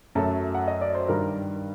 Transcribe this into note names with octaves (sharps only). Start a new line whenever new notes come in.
F#2 F#3 A3 A4
F#5
D#5
D5
C5
G2 D#3 G3 A#4